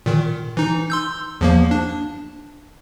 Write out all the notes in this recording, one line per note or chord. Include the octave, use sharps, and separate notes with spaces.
A#2 D#3
E3 D#4
C6 E6 G6
E2 F3 A#3
D4